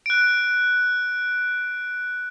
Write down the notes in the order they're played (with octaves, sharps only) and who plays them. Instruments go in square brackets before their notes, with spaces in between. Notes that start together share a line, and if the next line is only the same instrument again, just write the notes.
[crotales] F#6 D7